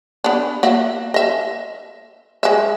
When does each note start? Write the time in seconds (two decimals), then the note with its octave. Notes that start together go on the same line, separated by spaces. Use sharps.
0.24 B3 D4
0.63 A#3 F#4 E5
1.14 D#5 E5
2.43 G#3 E5